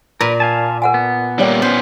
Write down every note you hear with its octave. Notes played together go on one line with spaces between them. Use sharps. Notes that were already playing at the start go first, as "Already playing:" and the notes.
A#2 A#4 B4
F5 G#5 A5
A#4 F#5 G#5
B3
G3 A#3 C#5 D5 G5
B3 C#4 C5